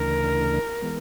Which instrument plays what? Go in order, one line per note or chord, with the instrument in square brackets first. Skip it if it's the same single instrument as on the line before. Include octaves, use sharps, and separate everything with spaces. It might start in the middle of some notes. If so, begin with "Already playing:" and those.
Already playing: [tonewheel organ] D2 C#3 E3 A3 D4 [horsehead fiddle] A#4
[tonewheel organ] E3 G#3 B3